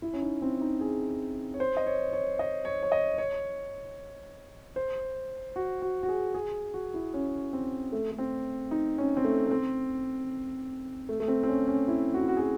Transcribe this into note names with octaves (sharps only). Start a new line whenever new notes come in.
E4
C#4
D#4
C4
D#4
G#4
C#5
C5
D#5
C#5
C#5
D#5
C#5
C#5
D#5
C#5
C5
F#4
F#4
F#4
G#4
G#4
F#4
E4
C#4
C4
A3
A3
C4
D#4
C#4
C4
A3
A3
C4
A3
A3
C4
C4
C#4
C#4
E4
F#4
E4
F#4
G#4
F#4